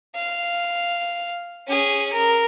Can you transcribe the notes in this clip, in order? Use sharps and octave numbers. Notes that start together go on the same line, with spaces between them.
F5
C#4 G#4
A#4